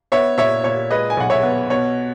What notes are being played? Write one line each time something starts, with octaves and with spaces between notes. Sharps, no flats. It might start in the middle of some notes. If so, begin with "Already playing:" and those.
B3 C#5 E5
A#2 C#5 E5
A#2 C#5
G#3 B4 D#5
G#5
B1 F#5
C#5 E5
B3
B2 C#5